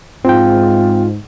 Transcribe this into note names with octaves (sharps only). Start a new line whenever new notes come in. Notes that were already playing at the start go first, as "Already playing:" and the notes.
G#2 C4 F4 G5